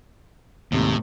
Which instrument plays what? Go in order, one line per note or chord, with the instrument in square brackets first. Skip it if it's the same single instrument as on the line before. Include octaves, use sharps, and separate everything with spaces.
[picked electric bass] D#2 C3 [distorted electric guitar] A2